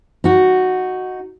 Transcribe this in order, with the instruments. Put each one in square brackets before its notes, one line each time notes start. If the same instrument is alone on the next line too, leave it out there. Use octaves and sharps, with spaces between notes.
[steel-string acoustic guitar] D#4 F#4